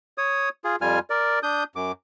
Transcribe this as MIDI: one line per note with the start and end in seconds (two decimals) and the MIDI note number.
0.18 0.49 73
0.18 0.49 87
0.64 0.76 65
0.64 0.76 68
0.81 0.99 41
0.81 0.99 55
0.81 0.99 65
0.81 0.99 80
0.81 0.99 89
1.10 1.39 70
1.10 1.39 74
1.43 1.64 62
1.43 1.64 87
1.43 1.64 91
1.76 1.92 42
1.76 1.92 86